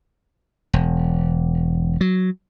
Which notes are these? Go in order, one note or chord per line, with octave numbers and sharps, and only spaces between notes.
E1
F#3